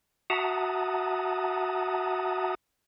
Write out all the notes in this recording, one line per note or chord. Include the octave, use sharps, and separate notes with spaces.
F#4 E5 F#5 A5 A#5 D#6